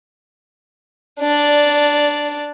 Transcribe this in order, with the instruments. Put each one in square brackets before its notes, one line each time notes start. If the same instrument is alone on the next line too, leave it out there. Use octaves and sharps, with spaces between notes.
[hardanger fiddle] D4 D5